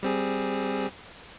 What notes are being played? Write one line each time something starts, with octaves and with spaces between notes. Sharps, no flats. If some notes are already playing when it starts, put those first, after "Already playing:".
G3 C4 G#4